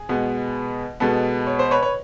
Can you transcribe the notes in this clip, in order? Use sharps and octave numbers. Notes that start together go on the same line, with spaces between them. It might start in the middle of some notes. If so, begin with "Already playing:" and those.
Already playing: G#4
B2 G#3 B3
B2 G#3 B3 A4
C#5
C5
B4 C#5
C#5